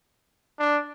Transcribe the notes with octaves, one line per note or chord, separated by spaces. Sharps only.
D4